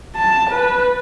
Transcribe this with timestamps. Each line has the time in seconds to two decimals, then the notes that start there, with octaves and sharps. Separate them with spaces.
0.15 A5
0.50 B4